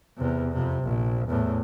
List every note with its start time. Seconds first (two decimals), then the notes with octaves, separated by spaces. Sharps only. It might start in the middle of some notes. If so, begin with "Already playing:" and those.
0.17 E2 C3
0.53 F2 C3
0.83 A#1
1.28 E2 A2